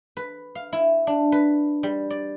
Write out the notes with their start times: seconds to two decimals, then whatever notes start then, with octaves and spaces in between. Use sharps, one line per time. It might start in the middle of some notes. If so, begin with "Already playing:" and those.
0.17 B4
0.55 F5
0.73 E4
1.07 D4
1.32 B4
1.83 G3
2.10 D5